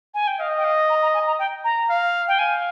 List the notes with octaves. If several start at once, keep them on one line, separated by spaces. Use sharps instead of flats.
G#5
G5
D#5 F5
G5
F5
A#5
A#5
G#5
A#5
G5
A#5
F5
G5
F5 G#5